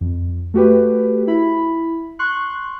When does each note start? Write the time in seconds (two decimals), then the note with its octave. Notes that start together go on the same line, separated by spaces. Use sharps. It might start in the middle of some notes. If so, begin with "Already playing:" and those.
0.01 F2
0.54 A3 F#4 G4 B4
1.27 E4 B5
2.19 C6 C#6 F#6